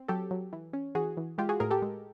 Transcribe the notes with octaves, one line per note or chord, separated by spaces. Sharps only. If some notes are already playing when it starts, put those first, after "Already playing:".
Already playing: C4
F#3 G4 A4
F#3
E3
C#4
E3 F#4 G#4
E3
G#3 F4 G4
F#4 G#4
A2 G#4 A#4
G4 A4
G#3